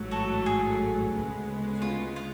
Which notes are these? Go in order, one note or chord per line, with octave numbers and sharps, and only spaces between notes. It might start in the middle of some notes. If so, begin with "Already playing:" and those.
Already playing: A1 G#2 F#3 A3
F#4 A4
G#4
D2 C#3 G#3 B3
F4
F4